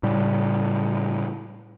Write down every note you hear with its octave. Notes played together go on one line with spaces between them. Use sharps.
A2 C#3 G3